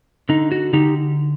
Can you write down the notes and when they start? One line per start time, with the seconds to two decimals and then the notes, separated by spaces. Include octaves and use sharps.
0.29 D3 D#4
0.52 F#4
0.73 D3 D#4 G4